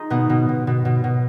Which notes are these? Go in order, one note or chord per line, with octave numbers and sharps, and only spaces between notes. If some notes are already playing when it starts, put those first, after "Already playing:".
Already playing: D#4 F4 G#4
B2 B3
B2
B2
B2
B2
B2